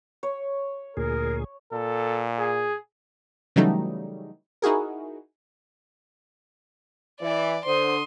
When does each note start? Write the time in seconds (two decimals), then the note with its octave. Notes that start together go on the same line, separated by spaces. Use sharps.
0.23 C#5
0.97 D2 A#2 G#4 A#4
1.72 A#2 A4
2.39 G#4
3.56 C#3 E3 F#3 G3 A3 D#4
4.62 D#4 E4 F#4 G#4 A#4
7.21 E3 D5
7.66 D3 C5 C6 D#6